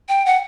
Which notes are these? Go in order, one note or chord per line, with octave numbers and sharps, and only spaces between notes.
G5
F#5